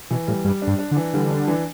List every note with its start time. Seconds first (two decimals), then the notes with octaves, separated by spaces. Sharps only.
0.11 B2 E3
0.28 A2 G3
0.45 G2 G3
0.62 D4
0.67 G2
0.79 D4
0.91 D3
0.96 E3
1.14 D3 G3
1.31 D4
1.48 E3